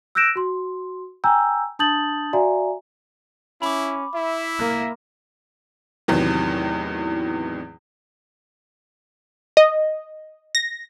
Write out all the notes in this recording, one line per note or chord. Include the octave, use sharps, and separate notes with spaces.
E6 F#6 G6 A#6 D7 E7
F#4 C6
G5 G#5 A#5 E6 G6
D4 A5 D#6 G6 A6 F#7
F#4 D5 E5 F5 G#5 A#5
C#4 E4 B5 D6
E4 E5
A#3
E2 A2 C3 D#3 E3 F#3
D#5
A#6